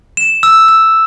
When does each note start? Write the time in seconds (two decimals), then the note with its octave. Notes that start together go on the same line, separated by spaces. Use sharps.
0.17 E7
0.43 E6
0.68 E6